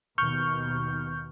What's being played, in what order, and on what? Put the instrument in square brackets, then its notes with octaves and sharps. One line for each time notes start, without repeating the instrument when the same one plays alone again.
[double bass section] D#2 B2 D#3 [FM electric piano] C#6 F6 G6